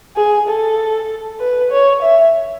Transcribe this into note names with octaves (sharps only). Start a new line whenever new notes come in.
G#4
A4
B4
C#5
E5